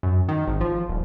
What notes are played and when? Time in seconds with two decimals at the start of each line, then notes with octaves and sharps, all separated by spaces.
0.03 F#2
0.28 D#3
0.48 G#1
0.61 F3
0.89 D#1